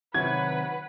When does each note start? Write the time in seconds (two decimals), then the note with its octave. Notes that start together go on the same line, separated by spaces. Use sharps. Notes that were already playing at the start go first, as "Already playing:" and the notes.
0.14 C3 D#3 F#3 B4 F#5 G#6